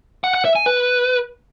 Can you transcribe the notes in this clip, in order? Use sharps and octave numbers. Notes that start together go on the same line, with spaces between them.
F#5
F#5
E5
G#5
B4